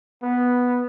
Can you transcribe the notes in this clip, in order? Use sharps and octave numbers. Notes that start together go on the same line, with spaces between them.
B3